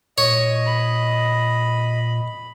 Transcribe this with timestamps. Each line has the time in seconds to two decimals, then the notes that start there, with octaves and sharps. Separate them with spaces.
0.18 A#2 C#5 D#5
0.66 B5